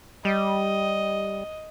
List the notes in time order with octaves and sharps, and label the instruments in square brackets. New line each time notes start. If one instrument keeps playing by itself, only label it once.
[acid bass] G3 [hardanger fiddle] D#5